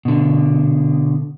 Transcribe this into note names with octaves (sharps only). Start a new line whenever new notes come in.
B2 D3